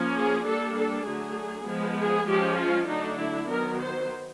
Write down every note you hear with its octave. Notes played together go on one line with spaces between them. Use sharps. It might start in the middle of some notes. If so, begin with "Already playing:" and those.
Already playing: F3 A#3 C#4
G#4
G3 A#3 D4 A4
A4
D3 F#3 A3 G#4
F3 G#3 B3
G#4
F3 G#3 C#4 G4
F4
D3 F#3 A3 D4 D#4
E4
D#3 F#3 B3 A#4
C5